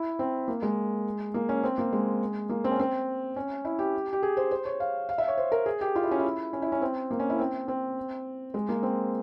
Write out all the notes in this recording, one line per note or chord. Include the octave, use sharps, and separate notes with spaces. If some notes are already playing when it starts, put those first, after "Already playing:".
Already playing: E4
C4
A#3
G#3
A#3
C#4
C4
A#3
G#3
A#3
C4
C#4
C4
C#4
E4
G4
G4
G#4
C5
C5
C#5
F5
F5
E5
C#5
C5
A#4
G#4
G4
F4
E4
C#4
E4
C#4
E4
C#4
C4
A#3
C#4
E4
C4
C4
G#3
A#3
C4